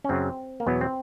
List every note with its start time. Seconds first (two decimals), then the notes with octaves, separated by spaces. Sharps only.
0.04 C#4
0.09 F#2 C#3 F#3 C4
0.60 A#3
0.66 E2 B2 F#3 B3
0.81 C4